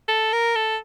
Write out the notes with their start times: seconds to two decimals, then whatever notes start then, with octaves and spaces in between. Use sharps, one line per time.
0.08 A4
0.33 A#4
0.55 A4